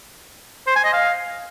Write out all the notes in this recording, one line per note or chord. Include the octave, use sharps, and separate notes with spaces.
C5
G#5
D#5
F5